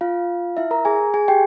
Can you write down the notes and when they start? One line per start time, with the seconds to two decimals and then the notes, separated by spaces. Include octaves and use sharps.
0.01 F4 F5
0.57 E4 E5
0.71 A#4 A#5
0.85 G#4 G#5
1.14 G#4 G#5
1.28 G4 G5